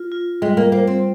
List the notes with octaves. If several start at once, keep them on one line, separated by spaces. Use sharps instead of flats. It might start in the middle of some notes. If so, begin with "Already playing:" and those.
Already playing: F4
F4
G3 G#3
A#3
A#3 C5
C4